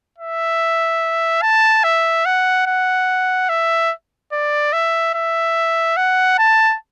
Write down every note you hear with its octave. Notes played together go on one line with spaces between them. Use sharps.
E5
A5
E5
F#5
F#5
E5
D5
E5
E5
F#5
A5